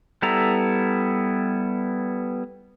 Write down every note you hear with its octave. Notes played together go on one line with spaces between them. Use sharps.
G3 B3 E4 A4 A#5